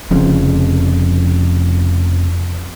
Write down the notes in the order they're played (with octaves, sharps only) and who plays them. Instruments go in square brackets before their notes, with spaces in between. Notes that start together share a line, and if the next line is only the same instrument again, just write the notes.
[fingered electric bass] F1 F2 C#3